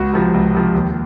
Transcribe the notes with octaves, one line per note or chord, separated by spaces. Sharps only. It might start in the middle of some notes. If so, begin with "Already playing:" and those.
Already playing: C#2 F#4
C3 F3
C#2
C3 F3
D#2